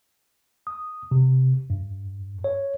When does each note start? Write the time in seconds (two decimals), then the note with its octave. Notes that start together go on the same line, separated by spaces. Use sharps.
0.67 D#6
1.11 C3
1.70 G2
2.44 C#5